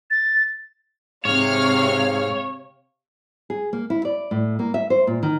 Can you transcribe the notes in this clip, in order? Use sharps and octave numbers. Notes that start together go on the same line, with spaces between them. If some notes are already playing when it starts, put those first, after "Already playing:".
A6
G#2 C3 C#5 F5 F6
G#4
A#3
E4
D5
A2
A#3
E5
C5
A#2
D#3